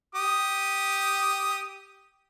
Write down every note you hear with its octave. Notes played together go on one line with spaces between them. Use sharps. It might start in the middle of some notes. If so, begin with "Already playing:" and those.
G4 D#6